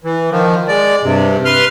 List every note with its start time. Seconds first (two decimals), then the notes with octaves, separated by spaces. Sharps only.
0.04 E3
0.31 D#3 F3
0.68 G#3 D5
1.03 G2 C3
1.45 B4 C6 F6